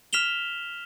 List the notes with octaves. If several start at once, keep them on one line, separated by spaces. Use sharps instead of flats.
F6 B6 E7 F7 G7